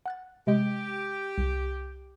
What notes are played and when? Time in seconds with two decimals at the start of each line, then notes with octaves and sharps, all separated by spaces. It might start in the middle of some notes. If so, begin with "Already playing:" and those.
0.06 F#5 F#6 A6
0.47 C3 G#3 G4 D#5
1.38 C2